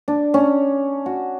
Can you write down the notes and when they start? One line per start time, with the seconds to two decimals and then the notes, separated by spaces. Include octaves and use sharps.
0.08 D4
0.34 C#4
1.06 F#4